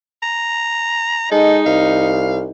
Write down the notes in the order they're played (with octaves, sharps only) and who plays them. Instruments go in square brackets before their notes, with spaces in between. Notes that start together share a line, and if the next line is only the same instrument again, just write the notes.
[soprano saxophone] A#5
[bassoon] G#3 [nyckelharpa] D#4 [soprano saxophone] A4
[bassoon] C2 [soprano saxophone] F5